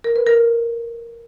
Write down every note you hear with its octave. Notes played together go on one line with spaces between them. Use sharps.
A#4
B4
A#4